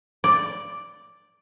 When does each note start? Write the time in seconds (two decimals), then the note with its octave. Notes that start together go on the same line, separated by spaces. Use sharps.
0.24 D5